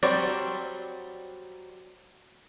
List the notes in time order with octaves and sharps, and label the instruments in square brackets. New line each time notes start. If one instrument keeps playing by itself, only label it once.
[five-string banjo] F#3 G3 C4 F#4 D5